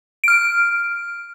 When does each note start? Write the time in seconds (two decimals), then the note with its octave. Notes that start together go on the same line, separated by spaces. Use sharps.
0.24 F6 D7